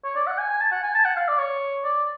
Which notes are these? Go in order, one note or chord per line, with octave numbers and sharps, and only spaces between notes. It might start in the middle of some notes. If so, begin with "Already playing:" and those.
C#5
D5
F#5
G#5
G#5
A5
F#5
G#5
A5
F#5
F5
D5
C#5
D5